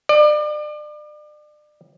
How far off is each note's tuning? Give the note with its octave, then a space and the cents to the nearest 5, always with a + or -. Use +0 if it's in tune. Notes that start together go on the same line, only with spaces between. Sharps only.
D5 +35